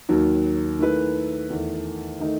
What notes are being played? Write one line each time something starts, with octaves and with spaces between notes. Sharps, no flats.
D#2 D#3 F#3
D#3 A3 E4 B4
E2 D#3 A3
D#3 A3 D#4